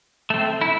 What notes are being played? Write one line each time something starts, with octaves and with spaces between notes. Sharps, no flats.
A3 C4
E4